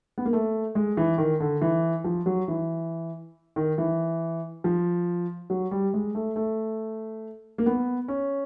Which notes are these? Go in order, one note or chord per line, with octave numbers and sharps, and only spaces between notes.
B3
A#3
A3
G#3
E3
D#3
D3
E3
F3
F#3
E3
D#3
E3
F3
F#3
G3
G#3
A3
A3
A#3
B3
C#4